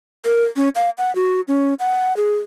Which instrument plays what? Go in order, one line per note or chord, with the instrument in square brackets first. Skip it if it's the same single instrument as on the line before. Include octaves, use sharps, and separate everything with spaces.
[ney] A#4
C#4
F5
F#5
F#4
C#4
F#5
G#4